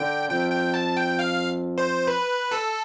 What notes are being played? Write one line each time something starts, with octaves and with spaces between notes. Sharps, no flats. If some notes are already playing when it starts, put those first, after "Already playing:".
Already playing: D3 G5
F2 G5
G5
A5
G5
F5
C5
B4
A4